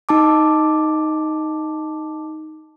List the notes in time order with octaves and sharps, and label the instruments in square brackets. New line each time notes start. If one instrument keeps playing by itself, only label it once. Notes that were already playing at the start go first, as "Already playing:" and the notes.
[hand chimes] D#4 A5 D6